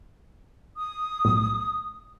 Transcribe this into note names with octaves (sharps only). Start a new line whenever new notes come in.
D#6
B1 A2